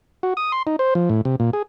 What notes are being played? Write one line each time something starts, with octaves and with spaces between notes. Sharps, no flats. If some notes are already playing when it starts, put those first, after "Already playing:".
F#4
D#6
C6
D#4
C5
F3
A2
C3
A#2
G#4